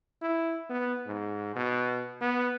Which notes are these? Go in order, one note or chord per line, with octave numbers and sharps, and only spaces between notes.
E4
B3
G#2
B2
B3